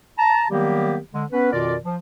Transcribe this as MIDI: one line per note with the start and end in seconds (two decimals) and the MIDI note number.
0.18 0.45 81
0.18 0.45 82
0.50 0.98 51
0.50 0.98 54
0.50 0.98 55
0.50 0.98 58
0.50 0.98 59
0.50 0.98 67
1.13 1.25 50
1.13 1.25 56
1.32 1.52 59
1.32 1.52 61
1.32 1.52 71
1.52 1.75 41
1.52 1.75 47
1.52 1.75 51
1.52 1.75 65
1.52 1.75 70
1.52 1.75 74
1.84 1.97 53